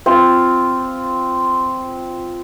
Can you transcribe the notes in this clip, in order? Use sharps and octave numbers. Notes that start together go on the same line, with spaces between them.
C4 F4